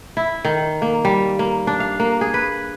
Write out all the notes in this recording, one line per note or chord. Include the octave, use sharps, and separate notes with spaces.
E4
D#3
A#3
G3
A#3
D4
F5
A#3
G#4
B4